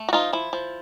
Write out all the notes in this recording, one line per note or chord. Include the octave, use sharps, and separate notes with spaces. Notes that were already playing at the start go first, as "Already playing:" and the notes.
Already playing: A3
F#4
F3 D#4 F4
F3 E4
F3